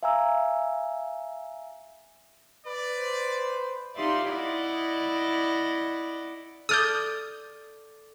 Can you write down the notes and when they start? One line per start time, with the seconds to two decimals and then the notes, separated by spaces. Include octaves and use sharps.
0.03 E5 F5 G#5 A#5 E6
2.66 B4 D5
2.98 C5
3.97 D#4 F4 G4 D5 E5 C6
4.27 E4 D5 D#5 F#5
6.69 A4 D5 D#6 F6 G6